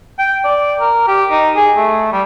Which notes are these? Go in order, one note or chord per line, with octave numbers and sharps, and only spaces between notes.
G5
D5
A#4
G4
D#4
G#4
A3
G3